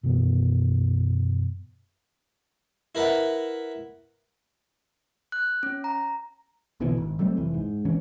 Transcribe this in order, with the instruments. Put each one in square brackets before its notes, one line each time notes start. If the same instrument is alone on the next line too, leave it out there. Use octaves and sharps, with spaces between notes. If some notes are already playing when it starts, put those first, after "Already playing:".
[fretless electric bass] F#2 B2 E3 B3
[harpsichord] E4 A#4 B4 E5 F#5
[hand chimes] F#6
C#4
A#5
[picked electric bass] A#1 B2 D3 E3
G#1
F#3 G3 A3 C4
F1 C2 E3
G#2
G#1 E3 C#4 D4